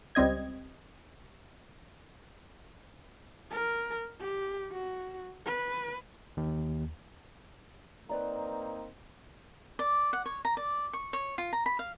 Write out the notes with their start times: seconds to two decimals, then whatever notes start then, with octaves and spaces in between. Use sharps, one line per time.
0.15 C#2 G3 C4 D#5 G#6
3.51 A#4
4.20 G4
4.72 F#4
5.47 B4
6.37 D#2
8.09 A#3 C4 D#4 B4 D5 A#5
9.79 D5
10.13 F#5
10.26 C#5
10.45 A#5
10.57 D5
10.93 C#6
11.13 C#5
11.38 F4
11.53 A#5
11.66 B5
11.79 F5